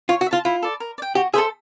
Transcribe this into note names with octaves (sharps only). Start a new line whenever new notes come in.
F4 C#5
F#4
E5
F4 A5
E4 F4
A4 D5
A#4
D5
G5
F#4 G4
G#4 A4 C5 E5